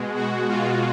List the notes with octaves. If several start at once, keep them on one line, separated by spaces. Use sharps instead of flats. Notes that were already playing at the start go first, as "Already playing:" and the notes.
Already playing: B2 G#3
F#4
F4